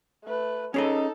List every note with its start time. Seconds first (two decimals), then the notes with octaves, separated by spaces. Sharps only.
0.25 A3 B4
0.74 C#4 D#4 G#4 A4 D#5